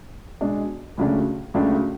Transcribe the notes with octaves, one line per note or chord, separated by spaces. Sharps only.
B2 G#3 D4
C#2 C#3 F#3 A3 D4
C#2 C#3 F#3 A3 D4